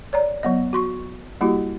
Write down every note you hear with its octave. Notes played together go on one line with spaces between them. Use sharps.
C#5 D5 A#5
F#3 B3 D#5
F#4 C6 C#6
G3 A#3 E4 F#4 G4